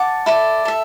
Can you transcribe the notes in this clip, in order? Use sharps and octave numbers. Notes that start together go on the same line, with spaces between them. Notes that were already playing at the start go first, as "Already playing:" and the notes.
Already playing: F#5 A5 D6
E4 A4 D5
A4 E5